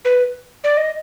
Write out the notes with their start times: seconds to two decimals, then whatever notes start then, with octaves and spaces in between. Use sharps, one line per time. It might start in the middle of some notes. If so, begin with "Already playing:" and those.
0.05 B4
0.64 D5
0.77 D#5